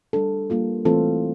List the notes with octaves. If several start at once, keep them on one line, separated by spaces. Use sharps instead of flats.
G3 D4 A4
G3 A#3 F4 A4
E3 A3 C4 F4 A4